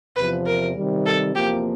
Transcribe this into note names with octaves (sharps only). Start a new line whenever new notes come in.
E2 C3 F3 B4
A#4
C3 D#3 G3
A4
E2 C3 F3 A#3 G4